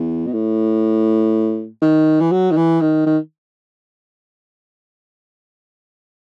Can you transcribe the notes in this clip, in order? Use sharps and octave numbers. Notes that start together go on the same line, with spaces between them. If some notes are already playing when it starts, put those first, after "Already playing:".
Already playing: E2
B2
A2
D#3
E3
F#3
D#3
E3
D#3
D#3